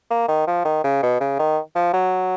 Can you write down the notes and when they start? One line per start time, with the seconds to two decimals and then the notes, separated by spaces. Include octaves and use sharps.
0.10 A#3
0.28 D#3
0.47 F3
0.65 D#3
0.84 C#3
1.03 B2
1.20 C#3
1.39 D#3
1.75 F3
1.94 F#3